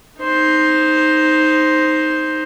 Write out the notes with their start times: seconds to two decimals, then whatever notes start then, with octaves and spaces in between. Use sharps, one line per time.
0.22 D#4 C5